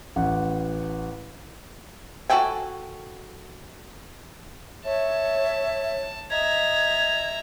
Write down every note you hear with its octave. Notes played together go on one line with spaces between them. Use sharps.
A1 F#5
F#4 G#4 A4 G5 G#5
C#5 E5 A5
D#5 E5 A#5 G#6